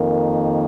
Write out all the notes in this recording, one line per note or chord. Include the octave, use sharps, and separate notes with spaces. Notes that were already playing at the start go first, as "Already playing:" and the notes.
Already playing: F2 D#3 A#3